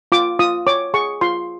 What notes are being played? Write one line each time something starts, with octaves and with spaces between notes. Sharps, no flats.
F4 D6
F4 D#6
C#5 D6
G#4 C#6
F4 C6